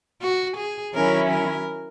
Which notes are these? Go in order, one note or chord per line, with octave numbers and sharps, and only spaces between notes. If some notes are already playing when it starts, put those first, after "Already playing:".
F#4
G#4
D#3 F#3 C#4 E4 A#4
A#4